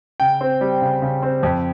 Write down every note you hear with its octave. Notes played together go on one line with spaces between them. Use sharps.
C#3 G5
C4
G3
C#3
C#3
C4
F2